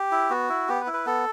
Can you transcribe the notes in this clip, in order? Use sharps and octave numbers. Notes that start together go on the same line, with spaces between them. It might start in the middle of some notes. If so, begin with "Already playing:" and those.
Already playing: G4
E4
B3 F#4
E4
B3 G4
B4
E4
B4
B3 A4